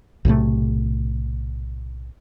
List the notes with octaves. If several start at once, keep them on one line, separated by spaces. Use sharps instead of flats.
B1 A2 C3 A3